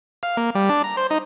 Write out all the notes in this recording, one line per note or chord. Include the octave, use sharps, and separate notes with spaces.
F5
A#3
G3
D4
A#5
C5
D#4